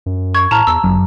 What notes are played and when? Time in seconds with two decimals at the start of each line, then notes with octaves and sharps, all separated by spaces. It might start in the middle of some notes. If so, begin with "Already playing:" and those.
0.06 F#2
0.35 C#6 G#6
0.51 A2 A5 A#5 F6
0.67 E2 E6
0.83 G1 F#2